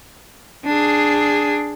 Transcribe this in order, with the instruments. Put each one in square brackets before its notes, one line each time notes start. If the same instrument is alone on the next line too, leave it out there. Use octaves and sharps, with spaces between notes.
[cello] D4 G#4